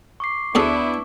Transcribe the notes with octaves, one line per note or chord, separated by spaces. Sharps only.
C#6 D6 C7
D2 B3 D4 E4 G#4 A4 C#6 D6